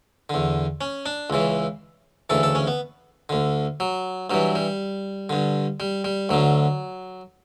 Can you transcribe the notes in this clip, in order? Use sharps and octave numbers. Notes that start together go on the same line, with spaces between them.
E2 D3
C#4
D4
C#2 C#3 E3
D2 C#3 E3 A4
A4
C#4
B3
D2 D3
F#3
G2 E3 F#3
G3
G2 D3
G3
G3
D2 D3 F#3